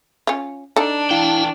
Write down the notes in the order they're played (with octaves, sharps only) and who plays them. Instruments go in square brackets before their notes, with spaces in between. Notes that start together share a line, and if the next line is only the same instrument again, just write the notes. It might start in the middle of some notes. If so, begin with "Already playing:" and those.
[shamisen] C#4 F4
[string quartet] D4 [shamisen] D#4 A4
[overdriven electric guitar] E3 G5 [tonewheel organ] E4 F5